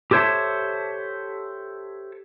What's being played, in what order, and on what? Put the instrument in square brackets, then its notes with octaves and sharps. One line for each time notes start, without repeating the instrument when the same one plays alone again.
[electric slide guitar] G4 A4 C5 C#5 E5 A5